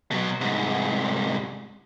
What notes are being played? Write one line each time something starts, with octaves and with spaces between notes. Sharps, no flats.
B2 F#3
C2 G#2